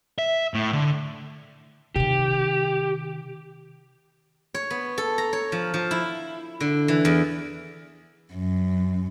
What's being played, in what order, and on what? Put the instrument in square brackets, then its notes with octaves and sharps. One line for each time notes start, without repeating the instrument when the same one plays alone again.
[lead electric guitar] E5
A2
D3
[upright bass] C3 D#3 [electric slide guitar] G4
[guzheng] C#5
B3
A4
A#5
C#5
F3
F3
E4
D3
E3
E2
[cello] F#2